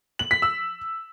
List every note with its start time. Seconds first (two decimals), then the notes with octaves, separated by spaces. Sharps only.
0.19 F#7
0.31 B6
0.42 E6